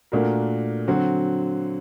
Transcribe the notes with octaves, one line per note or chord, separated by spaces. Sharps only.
A#2 A3 D4 F#4 A#4
D3 F#3 C4 F#4